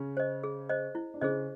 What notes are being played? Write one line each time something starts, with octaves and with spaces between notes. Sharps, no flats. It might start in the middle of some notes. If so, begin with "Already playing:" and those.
Already playing: C#3 C#4
C5 D#5
G#4
C5 D#5
E4
D4
C#3 C#4 G#4 C5 D#5